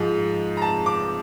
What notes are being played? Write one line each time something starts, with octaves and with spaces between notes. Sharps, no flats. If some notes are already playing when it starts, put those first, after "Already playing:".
Already playing: G#2 F3 G#3
A#5
A5
D6